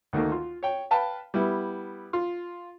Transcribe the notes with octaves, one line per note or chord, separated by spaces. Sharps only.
D2 D#3 A3 A#3
F4
C#5 G5
B4 F5 G5 A5 B5
G3 B3 E4
F4